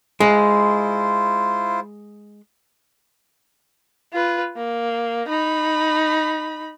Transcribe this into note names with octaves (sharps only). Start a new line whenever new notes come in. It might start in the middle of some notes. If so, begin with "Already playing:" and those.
G#3 E4 F4 C5
F4 B4
A#3
D#4 B5